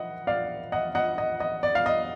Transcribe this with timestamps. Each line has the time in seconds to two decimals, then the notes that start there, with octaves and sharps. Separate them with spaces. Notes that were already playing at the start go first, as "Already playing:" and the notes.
Already playing: D#5 F#5
0.27 D5 F5
0.72 D#5 F#5
0.95 D#5 F#5
1.18 D#5
1.40 D#5
1.63 D5
1.75 F5
1.86 D#5